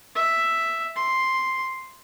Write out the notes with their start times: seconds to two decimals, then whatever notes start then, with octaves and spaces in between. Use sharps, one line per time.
0.15 E5
0.96 C6